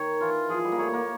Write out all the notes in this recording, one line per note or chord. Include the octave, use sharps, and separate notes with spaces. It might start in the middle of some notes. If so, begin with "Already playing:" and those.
Already playing: D#3 C#5
E3 F4
F3 G#4
G3
A#3
A3 C#5
A#3